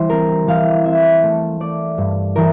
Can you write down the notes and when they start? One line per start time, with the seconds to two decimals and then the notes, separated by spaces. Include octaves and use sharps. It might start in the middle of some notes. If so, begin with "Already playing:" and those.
Already playing: E3 G3 C5
0.10 C4 A#4
0.47 E3 F5
0.85 C4 E5
1.23 A3
1.60 A3 D5
1.98 G2
2.36 E3 A#4